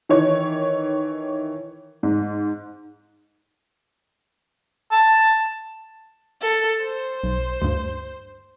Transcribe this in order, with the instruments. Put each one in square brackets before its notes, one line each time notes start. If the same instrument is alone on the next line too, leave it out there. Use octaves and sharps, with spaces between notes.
[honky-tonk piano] D#3 E3 C#5
G#2
[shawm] A5
[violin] A4
C5
[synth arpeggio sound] B1
D2 G2